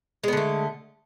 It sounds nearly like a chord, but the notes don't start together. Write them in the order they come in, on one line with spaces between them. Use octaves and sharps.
G#3 B3 D3 A3